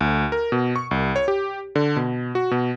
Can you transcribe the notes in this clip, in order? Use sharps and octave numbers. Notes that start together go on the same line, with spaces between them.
D2
A#4
B2
C#6
C2
C#5
G4
D3
B2
F#4
B2